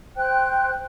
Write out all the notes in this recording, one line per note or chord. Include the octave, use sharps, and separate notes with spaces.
C5 G5 F#6